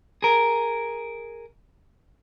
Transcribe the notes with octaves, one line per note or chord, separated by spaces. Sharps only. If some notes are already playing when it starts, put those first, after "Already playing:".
G#4 A#4